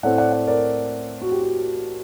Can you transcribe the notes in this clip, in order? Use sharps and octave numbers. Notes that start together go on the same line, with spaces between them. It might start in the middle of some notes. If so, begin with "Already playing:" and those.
A2 A3 C4 D5 F#5
D5 F#5
D5 F#5
A#4 D5
F#4
G4
F#4